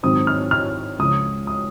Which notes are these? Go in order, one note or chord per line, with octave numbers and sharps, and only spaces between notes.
G#2 D#3 F#3 C4 D#6
F6
F6
C#2 C#3 F3 D#6
D#6